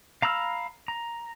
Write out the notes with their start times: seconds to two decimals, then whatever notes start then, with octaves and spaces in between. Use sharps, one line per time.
0.22 F5 A#5 B5 E6 F6
0.88 A#5